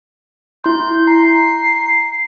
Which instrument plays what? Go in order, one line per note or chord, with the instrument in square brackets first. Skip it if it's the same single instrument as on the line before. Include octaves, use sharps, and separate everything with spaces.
[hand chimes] E4 C6 [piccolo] G6
[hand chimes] A#5 [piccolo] C7